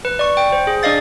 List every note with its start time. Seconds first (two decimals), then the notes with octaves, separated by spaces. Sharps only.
0.05 B4
0.19 D5 C#6
0.37 G5
0.52 C5
0.67 G#4
0.83 D4 D5 D#5 F5 A6